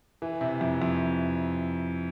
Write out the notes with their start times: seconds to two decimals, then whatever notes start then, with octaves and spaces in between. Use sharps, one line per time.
0.22 E3
0.41 C3
0.61 F2
0.82 F2